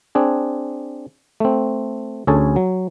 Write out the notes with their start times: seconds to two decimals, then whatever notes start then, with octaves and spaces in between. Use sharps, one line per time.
0.15 C4 D4 G#4
1.40 A3 C4
2.27 D2 C#4 G#4 A4 G#5 A5
2.56 F#3